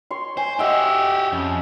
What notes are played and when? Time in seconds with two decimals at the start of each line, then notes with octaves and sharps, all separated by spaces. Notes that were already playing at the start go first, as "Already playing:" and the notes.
0.11 C#5 C6
0.37 C5 G#5
0.59 F#4 G4 D#5 E5 F#5
1.32 F2 C#4